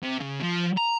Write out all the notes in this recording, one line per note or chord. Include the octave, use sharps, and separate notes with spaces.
C3
C#3
F3
A#5